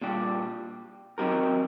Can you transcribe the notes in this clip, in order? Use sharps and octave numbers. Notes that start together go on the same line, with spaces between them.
A#2 G3 D4 G4
F#3 C4 D#4 G4 A#4